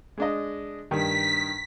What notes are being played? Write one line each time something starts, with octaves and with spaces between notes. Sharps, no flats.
G#3 D4 D#5
G2 D#3 B6